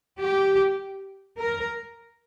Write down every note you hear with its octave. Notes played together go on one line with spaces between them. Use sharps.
G4
A#4